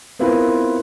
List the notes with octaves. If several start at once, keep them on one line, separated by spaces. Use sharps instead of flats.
B3 C4 E4 F4 A#4 B4